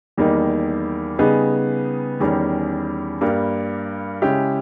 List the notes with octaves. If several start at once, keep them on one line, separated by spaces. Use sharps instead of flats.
E2 D#3 G3 A#3 D#4
C#3 G3 B3 D#4 G#4
E2 D#3 G3 C#4
G2 G3 A#3
C#3 G#3 C#4 E4 G4